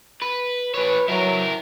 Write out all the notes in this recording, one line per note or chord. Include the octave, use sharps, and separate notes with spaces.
B4
E3 B4 C#5
F#3 E4 A#4